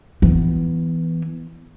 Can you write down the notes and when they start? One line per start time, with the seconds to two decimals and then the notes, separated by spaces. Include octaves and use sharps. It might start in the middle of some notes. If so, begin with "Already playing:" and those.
0.22 E3 B3